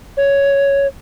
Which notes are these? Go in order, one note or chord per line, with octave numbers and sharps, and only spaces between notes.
C#5